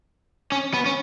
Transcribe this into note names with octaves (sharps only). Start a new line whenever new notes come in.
C#4
B3
C#4